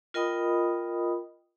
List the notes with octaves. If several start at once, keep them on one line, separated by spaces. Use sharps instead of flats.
F4 A#4 D#5 G5 B5 D#6